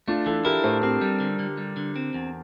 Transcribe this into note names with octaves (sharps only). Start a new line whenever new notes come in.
A3 D4 F4
E3 F4 A4
E4 G4 A#4
A2 A4 C5
C4 G4 A#4
G3
D3
D3
G3
D3
C4
E2